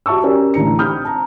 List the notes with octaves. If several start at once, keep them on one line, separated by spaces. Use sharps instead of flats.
F#4 E5 A5 C#6 E6
C#4 G4 A#4 D5 G#5
A1 D3 D4 A#5 C#7
C4 D#4 B5 D#6 F6 G6
A5 A#5